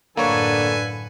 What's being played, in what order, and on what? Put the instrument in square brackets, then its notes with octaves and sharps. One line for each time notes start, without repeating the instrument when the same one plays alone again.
[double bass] F#2 A2 [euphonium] D3 [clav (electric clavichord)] A#3 C#5 [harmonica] A4 B4 G#5